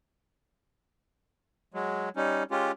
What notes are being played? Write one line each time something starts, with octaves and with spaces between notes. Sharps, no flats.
F#3 G#3
G3 C#4 D#4
G#3 C#4 F4 G4